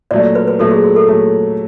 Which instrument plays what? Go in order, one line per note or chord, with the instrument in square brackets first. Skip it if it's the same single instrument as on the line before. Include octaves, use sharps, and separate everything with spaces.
[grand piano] A#2 F#3 A3 [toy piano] D5
[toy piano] B4
B4
[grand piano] A#2 F#3 A3 [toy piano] A4
[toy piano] G#4
G#4
A4
[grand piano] A#2 F#3 A3